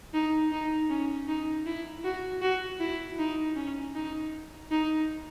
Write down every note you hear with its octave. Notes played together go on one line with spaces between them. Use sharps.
D#4
D#4
C#4
D#4
E4
F#4
F#4
E4
D#4
C#4
D#4
D#4